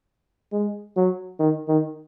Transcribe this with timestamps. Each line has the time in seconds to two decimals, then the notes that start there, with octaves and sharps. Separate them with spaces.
0.53 G#3
0.97 F#3
1.40 D#3
1.68 D#3